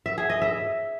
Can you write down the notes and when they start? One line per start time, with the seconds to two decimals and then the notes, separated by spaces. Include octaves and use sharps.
0.06 E5
0.18 G#4
0.30 D#5
0.42 E5